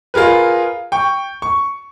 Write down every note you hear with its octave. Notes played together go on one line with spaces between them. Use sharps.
F4 G#4 A#4 B4
G5 C#6
C#6